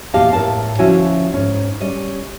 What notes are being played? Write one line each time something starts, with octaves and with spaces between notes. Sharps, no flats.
E2 A#2 G4 D#5 F5 A5
A2 A#4 A5
D2 F3 C#4 E4 F#4 G#5
G#2 C#4
G3 C#4 D#5